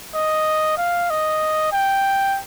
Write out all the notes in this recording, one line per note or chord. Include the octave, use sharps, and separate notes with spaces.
D#5
F5
D#5
G5